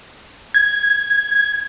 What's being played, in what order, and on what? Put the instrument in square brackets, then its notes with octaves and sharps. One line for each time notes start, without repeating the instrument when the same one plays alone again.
[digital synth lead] G#6